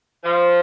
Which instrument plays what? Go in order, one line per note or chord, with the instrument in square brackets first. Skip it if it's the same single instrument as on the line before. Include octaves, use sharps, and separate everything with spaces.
[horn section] F3